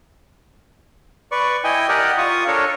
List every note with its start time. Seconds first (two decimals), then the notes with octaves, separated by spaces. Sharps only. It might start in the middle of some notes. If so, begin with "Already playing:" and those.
1.32 B4 D5 C#6
1.64 E4 D#5 G5 G#5
1.89 G4 A#4 D5 D#5 F#5
2.18 F4 C#6 D#6
2.47 D4 A4 A#4 C#5